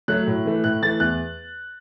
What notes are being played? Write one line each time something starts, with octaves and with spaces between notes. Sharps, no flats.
F#3 A3 F#6
A2
E3 A3
A2 F#6
E3 A3 A6
E2 F#6